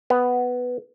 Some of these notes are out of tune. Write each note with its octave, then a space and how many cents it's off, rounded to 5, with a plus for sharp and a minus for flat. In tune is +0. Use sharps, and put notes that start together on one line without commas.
B3 +5